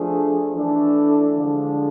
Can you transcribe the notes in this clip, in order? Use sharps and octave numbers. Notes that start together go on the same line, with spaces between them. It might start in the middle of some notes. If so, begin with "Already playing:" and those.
Already playing: F3 A3 D4 G#4
E3 A3 D4 A4
D3 F3 G#3 D4